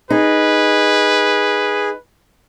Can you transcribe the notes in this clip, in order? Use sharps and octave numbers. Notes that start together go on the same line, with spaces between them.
D#4 G#4 B4